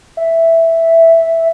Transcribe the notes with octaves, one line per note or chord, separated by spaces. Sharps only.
E5